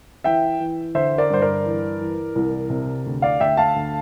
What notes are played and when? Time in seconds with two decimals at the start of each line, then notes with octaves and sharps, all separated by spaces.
0.24 E3 E5 G5
0.60 E3
0.95 D3 C5 E5
1.18 A#4 D5
1.30 G2 C5
1.41 A#4 D5
1.66 E3
2.01 E3
2.35 C2
2.70 C3
3.06 D2
3.22 D5 F5
3.40 D2 E5 G5
3.57 F5 A5
3.76 D2